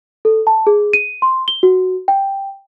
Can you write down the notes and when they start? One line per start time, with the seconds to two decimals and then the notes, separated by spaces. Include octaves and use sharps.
0.25 A4
0.47 A5
0.67 G#4
0.93 D#7
1.22 C6
1.48 G7
1.63 F#4
2.08 G5